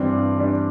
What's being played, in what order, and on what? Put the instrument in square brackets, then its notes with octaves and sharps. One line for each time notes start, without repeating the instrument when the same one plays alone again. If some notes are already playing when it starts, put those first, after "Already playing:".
Already playing: [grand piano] G2 E3 G3 D4 [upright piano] C4
[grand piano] G2
E3 G3 D4